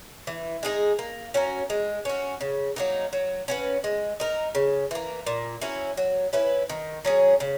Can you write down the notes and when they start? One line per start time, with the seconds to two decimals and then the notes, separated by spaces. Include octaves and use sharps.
0.27 E3
0.63 G#3 D#4 G#4
0.99 A#3
1.34 C#4 F#4 A#4
1.70 G#3
2.05 C#4 F#4
2.41 C#3
2.76 F#3 A#3 D#4
3.13 F#3
3.48 C#4 F#4 B4
3.84 G#3
4.20 D#4 A#4
4.55 C#3
4.91 E3 A#3
5.27 A#2
5.61 F#3 C#4 E4
5.97 F#3
6.33 C#4 E4 B4
6.69 D#3
7.05 F#3 C#4 G#4
7.40 C#3